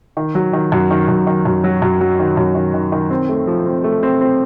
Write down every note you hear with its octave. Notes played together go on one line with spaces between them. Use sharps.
D#3
F#3
D#3
F#2
D#3
F#2
D#3
F#2
F#3
F#2
F#3
D#3
F#2
D#3
D#3
D#3
C4
A3
F3
C4
A3
C4
C4